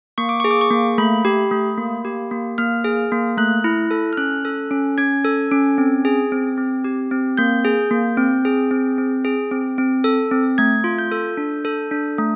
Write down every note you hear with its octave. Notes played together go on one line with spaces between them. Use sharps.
A#3 C#6
D6
G#4 C#6
D6
C#6
A#3
A3 B5
G4
A3
A#3
G4
A#3
A#3 F6
G#4
A#3
A3 F#6
E4
A4
F6
C#4 F#6
A4
C#4
C#4 G#6
A4
C#4
C4
G#4
C4
C4
G4
C4
A#3 G6
G#4
A#3
C4
G#4
C4
C4
G#4
C4
C4
A4
C4
A3 G#6
F4
G6
A4
D4
A4
D4
A3